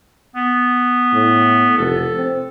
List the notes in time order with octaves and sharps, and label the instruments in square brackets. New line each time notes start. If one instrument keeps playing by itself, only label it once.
[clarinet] B3
[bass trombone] A2
[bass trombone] F1 [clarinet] A4
[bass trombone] C4